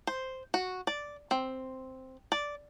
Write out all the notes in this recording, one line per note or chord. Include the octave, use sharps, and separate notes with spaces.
C5
F#4
D5
C4
D5